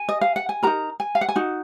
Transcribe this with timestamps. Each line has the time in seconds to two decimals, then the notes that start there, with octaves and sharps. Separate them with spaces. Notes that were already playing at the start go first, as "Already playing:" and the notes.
Already playing: G#5
0.09 D#5
0.21 F5
0.36 F#5
0.49 G#5
0.63 F#4 A#4 A#5
0.67 D#4
1.00 G#5
1.15 F5
1.21 F#5
1.29 G#5
1.36 D#4 F#4